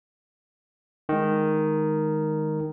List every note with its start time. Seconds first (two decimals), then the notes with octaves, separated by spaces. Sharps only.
1.09 D#3 G#3